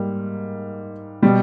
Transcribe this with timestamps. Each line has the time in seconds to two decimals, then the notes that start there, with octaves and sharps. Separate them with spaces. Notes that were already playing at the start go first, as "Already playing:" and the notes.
Already playing: G#2 G3 A#3
1.23 B2 G3